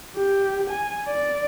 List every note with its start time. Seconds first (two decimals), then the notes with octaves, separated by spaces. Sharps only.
0.16 G4
0.70 G#5
1.08 D5